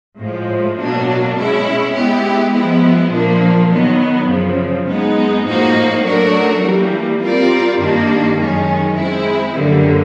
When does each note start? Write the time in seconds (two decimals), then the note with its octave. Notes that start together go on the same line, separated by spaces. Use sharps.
0.19 A2 F3 G#3
0.78 B2 F#3 A#3 D4
1.36 B2 G#3 C#4 E4
1.94 G#3 B3 E4 G4
2.53 F3 G#3 B3 E4
3.12 A#2 F3 A#3 D4
3.70 D#3 F#3 B3
4.29 F#2 C#3 F3
4.87 G#3 B3 D#4
5.45 A2 F3 A#3 D#4 F#4
6.04 F#3 A3 D4 F#4 A#4
6.62 E3 G3 A#3
7.21 G3 C4 F4 A#4 D5
7.79 G2 D#3 G3 A#3 D4
8.37 F#2 D#3 G#3 C#4
8.96 G#3 C4 E4
9.55 F#2 D3 G3 A#3